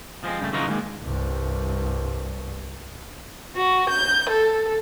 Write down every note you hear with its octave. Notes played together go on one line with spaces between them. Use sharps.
F3 G#3 B3 C4
G2 C#3 A3
C#3 E3 F#3 D#4 F4 A#4
D3 D#3 F3 G#3 A#3
C2 G2
F#4
G6
A4